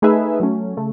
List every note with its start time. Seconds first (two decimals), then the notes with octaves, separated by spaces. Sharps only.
0.02 A3 D#4 G#4 B4 E5
0.40 F#3 A3 C#4
0.77 C#3 A3